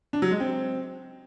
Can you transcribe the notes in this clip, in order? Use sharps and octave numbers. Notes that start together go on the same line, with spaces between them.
D4
F#3
G#3
C4